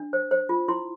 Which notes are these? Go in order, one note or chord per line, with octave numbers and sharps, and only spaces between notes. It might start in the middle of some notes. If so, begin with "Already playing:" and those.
Already playing: D4
C5
C5
F4
E4 C6